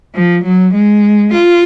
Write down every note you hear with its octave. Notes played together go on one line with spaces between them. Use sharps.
F3
F#3
G#3
F4